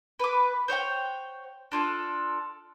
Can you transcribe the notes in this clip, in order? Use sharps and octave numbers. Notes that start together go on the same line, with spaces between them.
B4 D6
C5 C#5 F#5 G5
D4 F4 A4